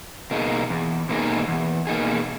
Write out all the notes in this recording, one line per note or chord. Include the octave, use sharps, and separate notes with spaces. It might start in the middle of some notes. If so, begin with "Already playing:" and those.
B2 A#3 D#4 G#4
E2
B2 A#3 D#4 G#4
E2
B2 A#3 D#4 G#4